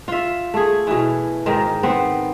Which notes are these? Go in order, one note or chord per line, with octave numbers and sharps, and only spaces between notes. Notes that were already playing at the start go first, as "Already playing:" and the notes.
F4 E5
A3 G#4
B2 E3
G#2 D#3 A#4
B3 C4